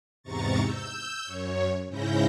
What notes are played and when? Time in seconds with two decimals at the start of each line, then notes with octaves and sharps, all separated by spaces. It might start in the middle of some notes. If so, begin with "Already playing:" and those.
0.23 E2 G#2 C3 A#5 C#6 A6
0.60 E6 G6
1.24 F#2 C#5
1.88 G#2 C#3 C#4 E4 G6 A#6